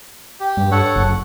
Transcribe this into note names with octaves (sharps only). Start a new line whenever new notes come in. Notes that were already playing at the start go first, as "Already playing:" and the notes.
G4
G2
A4 C#5 F#5
F#1